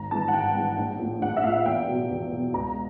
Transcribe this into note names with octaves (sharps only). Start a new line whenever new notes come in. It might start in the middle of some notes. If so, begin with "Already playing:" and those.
Already playing: G#1 A#5
G2 E3 G#3 A5
F#5
G#1 G5
G2 E3 G#3
A#1
A2 F3
A#1 F#5
E5
A2 F3 F5
E2 G5
B2 F#3
E2
B2 F#3
C#2 A#5